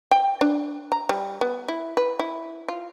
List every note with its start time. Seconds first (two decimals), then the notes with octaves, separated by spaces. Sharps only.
0.11 G5
0.41 D4
0.92 A#5
1.09 G3
1.41 B3
1.68 E4
1.97 B4
2.19 E4
2.68 F4